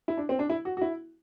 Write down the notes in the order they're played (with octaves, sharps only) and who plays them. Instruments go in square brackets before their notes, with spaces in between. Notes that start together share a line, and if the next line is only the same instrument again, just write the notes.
[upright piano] E4
D4
C4
D4
E4
F#4
F#4
E4